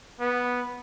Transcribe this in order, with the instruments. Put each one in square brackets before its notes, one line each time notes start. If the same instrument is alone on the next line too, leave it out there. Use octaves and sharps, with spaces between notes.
[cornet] B3